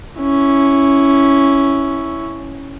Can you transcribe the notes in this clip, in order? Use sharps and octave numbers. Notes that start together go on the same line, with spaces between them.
C#4 E4